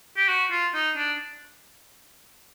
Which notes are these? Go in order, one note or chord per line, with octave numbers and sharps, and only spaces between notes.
G4
F#4
F4
D#4
D4